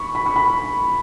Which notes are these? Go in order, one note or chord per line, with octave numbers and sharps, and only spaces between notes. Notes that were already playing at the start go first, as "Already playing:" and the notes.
Already playing: B5 C#6
B5
C#6
B5